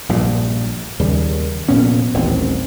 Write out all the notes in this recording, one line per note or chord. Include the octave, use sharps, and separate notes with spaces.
A#1 G2 A#2
D#2 C#3 G3
F1 A#2 B3 C#4
D#1 A1 D#2 C4